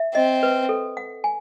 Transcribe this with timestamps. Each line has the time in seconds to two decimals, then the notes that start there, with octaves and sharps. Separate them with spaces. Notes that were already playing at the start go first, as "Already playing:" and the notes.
Already playing: E5
0.15 C4 D#5
0.43 B4
0.69 A4
0.97 F#5
1.24 G#5